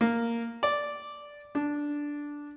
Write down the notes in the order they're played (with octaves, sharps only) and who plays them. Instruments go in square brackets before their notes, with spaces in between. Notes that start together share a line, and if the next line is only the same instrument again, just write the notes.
[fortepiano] A#3
D5
D4